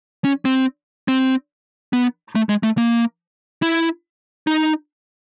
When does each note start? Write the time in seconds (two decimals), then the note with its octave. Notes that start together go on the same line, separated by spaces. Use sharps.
0.24 C#4
0.45 C4
1.08 C4
1.93 B3
2.35 A3
2.49 G#3
2.63 A3
2.78 A#3
3.62 E4
4.47 D#4